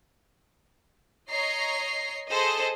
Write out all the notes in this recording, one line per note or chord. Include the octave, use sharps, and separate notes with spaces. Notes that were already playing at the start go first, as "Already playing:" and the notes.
C#5 D#5 A#5 C7
G#4 A4 C5 D#5